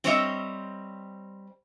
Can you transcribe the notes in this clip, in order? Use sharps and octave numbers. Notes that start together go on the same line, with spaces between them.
G3 C4 C5 C#5 D#5 E5